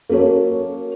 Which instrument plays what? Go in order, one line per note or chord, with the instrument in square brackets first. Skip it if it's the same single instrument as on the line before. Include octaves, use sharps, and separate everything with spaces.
[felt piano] A#3 C#4 F#4 A4 C#5